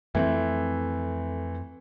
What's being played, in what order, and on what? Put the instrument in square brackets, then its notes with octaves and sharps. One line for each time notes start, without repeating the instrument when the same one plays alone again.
[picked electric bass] F2 A#3 C4 [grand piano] E3 A3